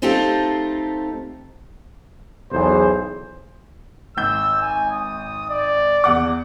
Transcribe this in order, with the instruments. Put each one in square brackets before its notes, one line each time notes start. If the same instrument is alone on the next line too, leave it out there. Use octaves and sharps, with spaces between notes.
[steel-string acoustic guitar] A3 C4 D#4 F4 G4 A4
[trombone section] B1 E2 G#4 C5
[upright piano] G#1 G6 [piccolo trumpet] E6
[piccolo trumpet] G#5
D#6
D5
[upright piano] E2 F#5 D6